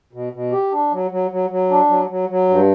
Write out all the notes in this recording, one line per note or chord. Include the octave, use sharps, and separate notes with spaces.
B2
B2
G4
D4
F#3
F#3
F#3
F#3
D4
F#3
F#3
F#3
G2